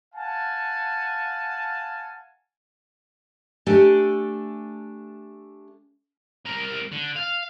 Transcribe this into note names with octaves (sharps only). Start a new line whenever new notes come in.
F5 F#5 G#5 A5
A3 D4 G4 A4 G#5
C2 A#4
D3
F5